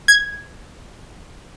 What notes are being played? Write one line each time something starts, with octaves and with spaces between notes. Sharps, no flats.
G#6